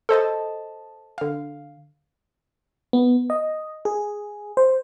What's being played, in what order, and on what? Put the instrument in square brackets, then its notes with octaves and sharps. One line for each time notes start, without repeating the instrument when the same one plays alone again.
[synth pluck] A4 C5 D#5 A5
D3 F5
[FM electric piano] B3
D#5
G#4
C5